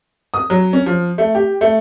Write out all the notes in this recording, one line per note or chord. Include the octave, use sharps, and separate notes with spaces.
D#6
F#3
C#4
F3
A3
G4
A3